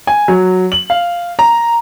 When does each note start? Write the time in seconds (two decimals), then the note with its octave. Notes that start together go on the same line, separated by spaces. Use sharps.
0.07 G#5
0.28 F#3
0.72 F#7
0.90 F5
1.39 A#5